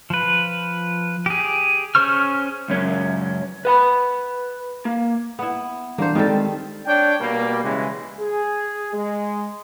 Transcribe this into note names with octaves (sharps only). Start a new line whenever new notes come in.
F3 B4
G4 G#4
C#4 G#4 C5 C#6 F6
C#2 F#2 C#4
B4 F#5 B5
A#3
B3 E4
E3 G3 A#3 D4 C5
D#3 G3 G#3 C4 D#4 A4
D4 C#5 G5
B2 G3 A#3
C#3 E3 G3 G#3
G#4
G#3